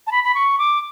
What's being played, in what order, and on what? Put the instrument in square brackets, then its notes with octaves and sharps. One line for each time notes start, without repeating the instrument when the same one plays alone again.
[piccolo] A5
B5
B5
C#6
D6